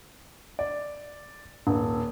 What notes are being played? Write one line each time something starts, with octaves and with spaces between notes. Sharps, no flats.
D5
D#1